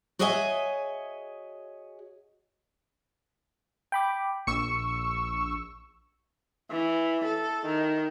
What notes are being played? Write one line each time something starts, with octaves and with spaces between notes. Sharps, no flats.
F#4 G#4 C#5 D#5 E5 G#5
G5 B5 D6
A#1 C#6 E6 C#7
E3
A4
D#3